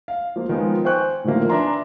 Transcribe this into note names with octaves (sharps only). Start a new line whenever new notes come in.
F5
F3 A#3
D#3 F3 G#3 B3
C5 G5 G#5 C#6 F#6
A2 D3 D#3 F3 A#3
D4 B4 E5 G#5 A#5 C6